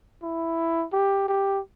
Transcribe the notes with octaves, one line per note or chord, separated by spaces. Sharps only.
E4
G4
G4